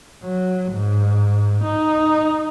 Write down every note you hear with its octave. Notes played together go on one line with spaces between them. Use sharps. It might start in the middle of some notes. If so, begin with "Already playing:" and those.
F#3
G#2
D#4